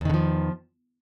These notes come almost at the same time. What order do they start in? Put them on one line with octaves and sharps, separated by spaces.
E2 D#3 D3 F3